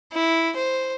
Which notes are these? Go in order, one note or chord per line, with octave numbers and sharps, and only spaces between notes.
E4
C5